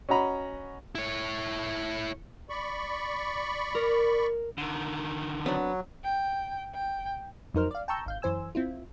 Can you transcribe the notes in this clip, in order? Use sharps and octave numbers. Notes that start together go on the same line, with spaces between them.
C#4 F#4 D#5 A#5 B5
E4 C#5
D5 B5 C#6
A#4
D3 D#3
F#3 B3 C4 D4
G5
G5
F2 F#3 D#4 A#4 C5 F6
D5 F5
G5 A5 A#5 C#6 E6 G6
G#1 F5 G6
F#2 E3 C5 G#5 E6
C4 E4 F4